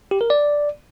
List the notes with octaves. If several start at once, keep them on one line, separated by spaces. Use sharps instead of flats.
G4
A#4
D5